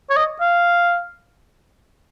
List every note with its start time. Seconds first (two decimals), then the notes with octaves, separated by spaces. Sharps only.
0.10 C#5
0.17 D#5
0.40 F5